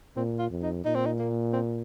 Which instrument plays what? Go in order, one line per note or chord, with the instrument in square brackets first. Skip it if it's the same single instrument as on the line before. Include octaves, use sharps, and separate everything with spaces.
[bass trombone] A#2 [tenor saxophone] C4
[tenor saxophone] F4
[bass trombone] F2
[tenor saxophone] D#4
[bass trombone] A#2 [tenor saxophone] D#4
[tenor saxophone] C4
D#4
A#3
C4